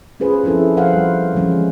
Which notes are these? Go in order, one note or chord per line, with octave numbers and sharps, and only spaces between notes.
C#4 F4 G#4 B4 C5
F3 C4 C#4 E4 A4
F3 A#4 C5 F5 F#5
G3
D3 E3 F3 G3 G#3 C#4